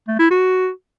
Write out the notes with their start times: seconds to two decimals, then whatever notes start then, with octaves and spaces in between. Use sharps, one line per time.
0.08 A3
0.19 E4
0.31 F#4